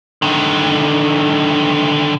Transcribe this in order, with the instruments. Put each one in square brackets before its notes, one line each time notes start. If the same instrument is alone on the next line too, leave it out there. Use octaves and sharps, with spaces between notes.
[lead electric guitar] D3 D#3